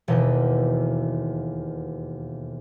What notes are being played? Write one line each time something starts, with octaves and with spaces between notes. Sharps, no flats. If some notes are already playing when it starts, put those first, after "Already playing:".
E1 D#2 B2 D#5